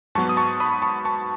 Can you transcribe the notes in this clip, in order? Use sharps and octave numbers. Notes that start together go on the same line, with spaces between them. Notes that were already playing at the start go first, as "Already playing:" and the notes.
G#2 F#3 B3 A5 C#6
D#6
A5 C#6
B5 D#6
A5 C#6
A5 C#6